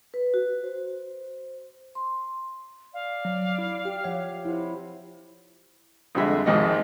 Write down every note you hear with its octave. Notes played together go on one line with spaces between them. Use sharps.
B4
F#4
C5
C6
D5 F5
F#3
E4
G4 F6
F3 C#5 E5 F#5
C3 E4
F2 D3 G3 G#3 E5
G#1 D#2 G#2 C3 F3 D#5